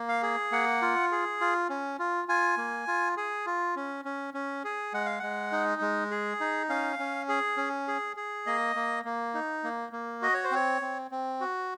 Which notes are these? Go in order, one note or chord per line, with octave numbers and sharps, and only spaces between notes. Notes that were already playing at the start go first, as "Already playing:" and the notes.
Already playing: A#3
F5
G#4
A#3 F#5
F4
G#4
F4
C#4
F4
F4 G#5
A#3
F4
G#4
F4
C#4
C#4
C#4
G#4
G#3 F#5
F5
G#3 F#5
D#4
G#3
G#4
D#4
C#4 F5
C#4
G#4
C#4
G#4
G#4
A#3 D#5
A#3
A#3
D#4
A#3
A#3
F#4 D#5
C#5
C5
C4 C#5
C4
C4
F#4